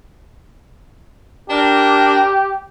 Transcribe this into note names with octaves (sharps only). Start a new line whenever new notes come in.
D4 G4 A#4